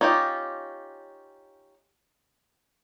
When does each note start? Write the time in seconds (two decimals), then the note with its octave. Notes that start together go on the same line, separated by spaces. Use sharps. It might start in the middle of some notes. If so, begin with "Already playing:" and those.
0.01 C#4 D#4 F4 G4